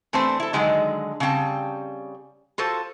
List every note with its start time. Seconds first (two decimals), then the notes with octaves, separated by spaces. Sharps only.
0.13 E3 A3 C4 D4 B4 C5
0.40 E4 A4
0.53 D3 D#3 F#3 G#3 D#4
1.20 C#3 G3 C4 G5 A5
2.58 F4 F#4 A4 C5